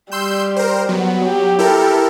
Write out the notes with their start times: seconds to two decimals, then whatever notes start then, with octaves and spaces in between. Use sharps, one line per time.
0.12 G3 C6 E6 G6
0.56 A#4 C5
0.89 F#3 B3
1.26 G4
1.59 E4 A4 A#4